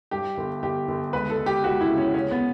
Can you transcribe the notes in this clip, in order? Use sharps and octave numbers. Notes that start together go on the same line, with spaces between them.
G2 G4
G1
G1 G4
G1
C#2 B4
A4
C#2
G4
C#2 F#4
E4
C#3
C#4
C#3 C#4
B3